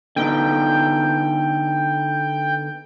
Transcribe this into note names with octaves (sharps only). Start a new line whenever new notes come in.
D3 B3 D#4 G5